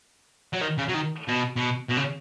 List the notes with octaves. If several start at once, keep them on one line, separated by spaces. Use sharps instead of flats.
F#3
D#3
C#3
F#3
D#3
B2
B2
B2
C#3